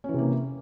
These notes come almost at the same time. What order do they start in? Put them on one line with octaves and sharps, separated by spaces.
C#4 E3 C3 A#3